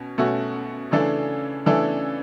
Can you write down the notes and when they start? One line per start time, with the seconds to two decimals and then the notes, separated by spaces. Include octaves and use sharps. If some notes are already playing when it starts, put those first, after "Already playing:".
Already playing: B2 C#4
0.18 B2 A3 C#4 F#4
0.91 C#3 E3 A3 D4 A4
1.66 C#3 E3 A3 D4 A4